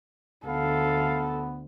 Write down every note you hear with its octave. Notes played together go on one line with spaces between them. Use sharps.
D2 B3 A4 F5